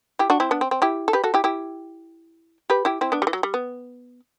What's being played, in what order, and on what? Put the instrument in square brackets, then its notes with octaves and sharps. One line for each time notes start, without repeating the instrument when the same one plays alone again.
[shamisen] E4 G4
D4 F#4
C4 E4
B3 D4
C4
C4
E4 G4
A4
G4 B4
F#4 A4
E4 G4
E4 G4
G4 B4
E4 G4
C4 E4
B3 D4
G3
E3
F#3
G3
B3